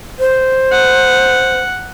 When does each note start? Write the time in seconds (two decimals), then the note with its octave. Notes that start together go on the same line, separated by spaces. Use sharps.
0.19 C5
0.72 F#5